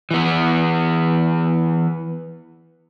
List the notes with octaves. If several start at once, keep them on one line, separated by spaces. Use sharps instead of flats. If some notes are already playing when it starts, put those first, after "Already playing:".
E3 B3